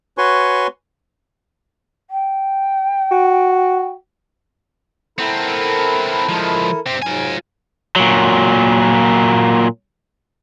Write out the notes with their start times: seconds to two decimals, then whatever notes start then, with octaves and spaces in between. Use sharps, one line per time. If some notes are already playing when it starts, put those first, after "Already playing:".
0.18 F#4 B4 C#5 G#5 C6 C#6
2.10 G5
3.11 F#4
5.19 B3 C4 E4 A4 A#4
6.29 F3 G#3
6.86 G2 C4 G4 C5
7.02 G#2 F#3 F4 G#5
7.96 A#2 F#3